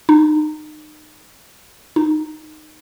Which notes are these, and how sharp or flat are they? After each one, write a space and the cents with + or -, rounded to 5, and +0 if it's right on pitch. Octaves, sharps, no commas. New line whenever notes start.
D#4 -30
D#4 -15